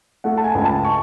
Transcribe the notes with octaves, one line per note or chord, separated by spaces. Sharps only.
A3 F#5
A5
G#5
C#2 G#5
A5
C#6